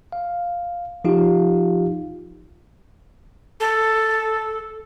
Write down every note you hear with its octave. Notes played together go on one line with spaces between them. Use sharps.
F5
F3 D#4 F4 G4 F5
A4